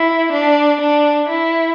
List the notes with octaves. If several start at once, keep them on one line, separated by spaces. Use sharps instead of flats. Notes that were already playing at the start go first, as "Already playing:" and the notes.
Already playing: E4
D4
D4
E4